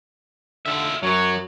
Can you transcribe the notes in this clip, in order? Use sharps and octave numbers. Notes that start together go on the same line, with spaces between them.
D3 F4 E5
F#2 F#3 C#5